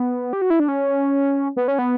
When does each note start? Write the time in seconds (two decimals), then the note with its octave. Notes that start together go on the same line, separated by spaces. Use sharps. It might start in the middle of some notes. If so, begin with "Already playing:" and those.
Already playing: B3
0.33 G4
0.42 F#4
0.50 E4
0.60 D4
0.68 C#4
1.56 B3
1.68 C#4
1.79 B3